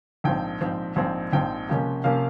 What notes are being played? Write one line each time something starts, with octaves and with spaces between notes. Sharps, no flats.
A#1 G#2 F3 C4 G5
A#1 G#2 F3 C4
A#1 G#2 F3 C4
A#1 G#2 F3 C4 G5
C#2 C3 F3 A#3 C#4
C3 F3 A#3 C#4 F5